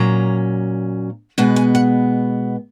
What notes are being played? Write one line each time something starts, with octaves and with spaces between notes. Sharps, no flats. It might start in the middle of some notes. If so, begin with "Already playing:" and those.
Already playing: A#2 F#3 C#4 A#5
B2 G#3 B3 G#5
G#5
F#5